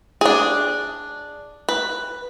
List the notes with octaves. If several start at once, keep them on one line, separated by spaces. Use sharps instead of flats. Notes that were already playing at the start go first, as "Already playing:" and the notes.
D4 G#4
B4